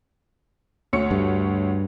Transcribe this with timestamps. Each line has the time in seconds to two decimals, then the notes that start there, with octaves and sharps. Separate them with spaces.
0.93 D2 C#5 C#7
1.11 G2